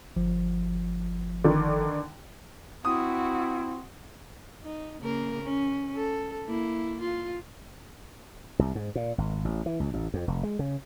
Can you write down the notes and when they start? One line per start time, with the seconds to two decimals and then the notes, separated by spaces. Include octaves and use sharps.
0.16 G1 F3
1.44 D3 D#3
2.85 C4 E4 F#4 D#6
4.63 D#4
5.01 C#3 A#3 A#4
5.43 C#4
5.95 A4
6.47 A#3 E4
7.01 F4
8.59 C2
8.75 G#2
8.95 A#2
9.18 G#1
9.45 A1
9.66 E3
9.80 C#2
9.94 A1
10.14 F2
10.28 F1
10.43 G#3
10.59 C#3